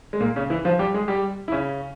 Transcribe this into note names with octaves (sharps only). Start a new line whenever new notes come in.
G#3
A#2 A#3
C#3 C#4
E3 E4
F3 F4
G3 G4
G#3 G#4
G3 G4
E4
C#3 C#4